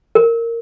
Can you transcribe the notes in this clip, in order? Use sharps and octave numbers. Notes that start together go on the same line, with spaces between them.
A#4